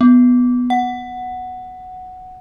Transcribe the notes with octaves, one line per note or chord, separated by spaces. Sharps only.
B3
F#5